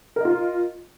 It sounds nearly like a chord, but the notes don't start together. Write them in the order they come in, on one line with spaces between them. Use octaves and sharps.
A#4 D#5 F4